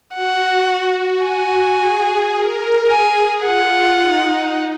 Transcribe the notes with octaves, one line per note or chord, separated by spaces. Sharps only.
F#4 F#5
G#5
G#4
A#4
G#4 G#5
F4 F#5
D#4